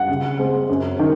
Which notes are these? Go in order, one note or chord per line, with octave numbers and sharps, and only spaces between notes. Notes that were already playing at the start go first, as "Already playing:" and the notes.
Already playing: F#5
C#3
G#3 C4
F#2
D#3